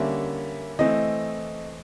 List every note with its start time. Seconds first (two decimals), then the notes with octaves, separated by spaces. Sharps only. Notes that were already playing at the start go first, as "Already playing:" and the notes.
Already playing: D3 G3 A#3 C#4 E5
0.79 E3 A3 C4 D#5